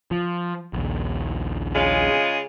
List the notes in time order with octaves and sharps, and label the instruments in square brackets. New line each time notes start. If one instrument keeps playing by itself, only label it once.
[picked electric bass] F3
A#1 D#2
[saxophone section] C#3 G#3 F4